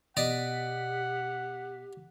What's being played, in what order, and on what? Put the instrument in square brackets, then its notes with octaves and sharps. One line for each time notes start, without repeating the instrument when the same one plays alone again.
[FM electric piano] B2 B6 [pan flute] G4 [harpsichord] D5 D#5 [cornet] F#5